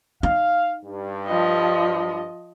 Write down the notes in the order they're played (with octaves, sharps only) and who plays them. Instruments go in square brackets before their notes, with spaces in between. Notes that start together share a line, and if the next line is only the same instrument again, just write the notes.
[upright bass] D#4 [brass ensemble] F5
[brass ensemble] G2
[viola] F3 D#5